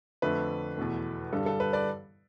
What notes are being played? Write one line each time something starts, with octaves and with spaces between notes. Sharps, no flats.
F2 D3 A3 B4
E2 B2 A3
G2 D3 G3 A4
A4
B4
B4 D5